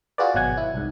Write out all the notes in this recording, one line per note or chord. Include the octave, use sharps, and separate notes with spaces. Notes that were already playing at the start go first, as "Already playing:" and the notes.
F4 F#4 G#4 B4 D5
G#1 B2 F#3 F#5 G#5
E4
C2 G#2